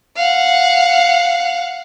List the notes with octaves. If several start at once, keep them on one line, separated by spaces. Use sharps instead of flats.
F5 F#5